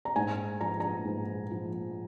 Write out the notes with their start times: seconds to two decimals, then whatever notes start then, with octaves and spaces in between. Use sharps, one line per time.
0.05 A#5
0.16 G#2 G#5
0.60 F3 A#5
0.80 A#5
1.05 G#2
1.51 F3